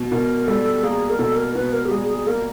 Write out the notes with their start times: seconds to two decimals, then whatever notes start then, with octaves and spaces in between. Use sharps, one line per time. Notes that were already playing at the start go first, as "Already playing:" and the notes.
Already playing: B2
0.11 B2 A#4
0.47 G3 A4
0.83 A#3 G#4
1.10 A#4
1.19 B2 A4
1.37 A#4
1.55 B2 B4
1.73 A#4
1.86 G4
1.91 G3 G#4
2.09 G#4
2.26 A#3 A#4